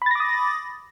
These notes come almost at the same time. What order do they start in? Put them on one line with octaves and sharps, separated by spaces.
B5 A6 A#6 D6 D#6